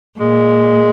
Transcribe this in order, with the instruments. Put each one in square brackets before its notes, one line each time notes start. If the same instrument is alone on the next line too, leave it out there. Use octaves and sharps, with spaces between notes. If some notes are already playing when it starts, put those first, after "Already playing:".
[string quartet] A#2 [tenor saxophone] G#3